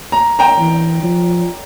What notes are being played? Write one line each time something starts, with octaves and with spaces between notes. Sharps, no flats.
A#5
G5 A#5
E3
F3